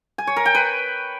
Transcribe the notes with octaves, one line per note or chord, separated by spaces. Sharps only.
G#5
C#5
A#4
G5
B4